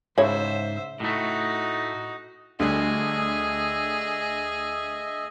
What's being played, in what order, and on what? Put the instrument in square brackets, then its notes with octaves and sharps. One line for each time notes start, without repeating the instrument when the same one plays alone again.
[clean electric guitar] G#2 [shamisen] C#3 E4 C#5 [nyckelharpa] C5 E5
[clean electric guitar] A2 A3 [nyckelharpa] D#4 F#4
[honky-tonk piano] D2 [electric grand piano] D3 G3 D4 [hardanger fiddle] G#4 [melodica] D#5 E5